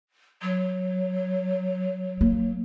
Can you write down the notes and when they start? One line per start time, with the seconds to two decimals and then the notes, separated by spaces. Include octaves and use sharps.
0.42 F#3
2.21 A#3